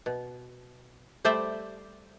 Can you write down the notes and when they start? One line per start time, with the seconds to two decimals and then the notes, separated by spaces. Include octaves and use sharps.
0.06 B2
1.25 G3 A3 C5 D5 E5